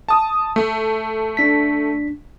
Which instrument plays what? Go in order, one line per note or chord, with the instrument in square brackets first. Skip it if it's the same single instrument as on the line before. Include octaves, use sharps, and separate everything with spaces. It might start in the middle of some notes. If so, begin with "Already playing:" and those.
[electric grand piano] A5 D#6
A3
[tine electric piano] D4 B6